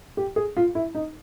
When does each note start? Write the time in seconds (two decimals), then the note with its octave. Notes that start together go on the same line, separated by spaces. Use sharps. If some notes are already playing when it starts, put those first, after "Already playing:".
0.17 G4
0.36 G#4
0.57 F4
0.75 E4
0.95 D#4